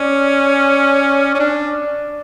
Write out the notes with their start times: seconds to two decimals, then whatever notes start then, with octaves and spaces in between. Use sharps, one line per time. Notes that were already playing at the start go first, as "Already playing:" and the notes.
Already playing: C#4 D5
1.35 C#4
1.40 D4